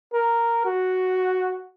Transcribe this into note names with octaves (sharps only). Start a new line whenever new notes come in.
A#4
F#4